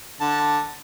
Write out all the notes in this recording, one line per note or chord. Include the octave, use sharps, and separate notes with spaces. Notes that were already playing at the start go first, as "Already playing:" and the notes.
D3 A5